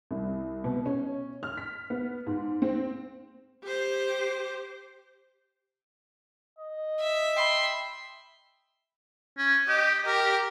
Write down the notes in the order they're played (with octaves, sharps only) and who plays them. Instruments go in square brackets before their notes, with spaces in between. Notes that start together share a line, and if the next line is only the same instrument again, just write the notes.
[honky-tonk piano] C2
B2
C#4
F6
B6
B3
G#2
C4
[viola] G4 C5
[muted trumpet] D#5
[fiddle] E5
[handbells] G5 B5 [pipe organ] C6
[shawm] C#4
[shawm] G4 [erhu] D#5
[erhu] G4 [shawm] A#4